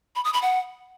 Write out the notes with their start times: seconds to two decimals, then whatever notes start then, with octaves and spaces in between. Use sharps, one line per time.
0.16 B5
0.24 D#6
0.33 B5
0.42 F#5